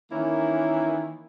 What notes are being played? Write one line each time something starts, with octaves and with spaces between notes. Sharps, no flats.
D#3 E3 A#3 C#4 E4